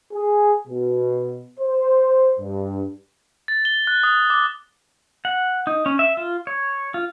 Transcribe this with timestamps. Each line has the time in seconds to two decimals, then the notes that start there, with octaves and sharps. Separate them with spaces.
0.12 G#4
0.68 B2
1.59 C5
2.39 G2
3.48 A6
3.65 G7
3.87 F#6
4.03 D#6
4.30 D6
5.25 F#5
5.67 D#4
5.86 C#4
5.99 E5
6.17 F4
6.47 C#5
6.94 F4